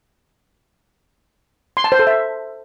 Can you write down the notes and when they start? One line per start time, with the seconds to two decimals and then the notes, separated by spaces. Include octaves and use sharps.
1.77 C6
1.84 A5
1.92 C5
1.99 A4
2.07 E5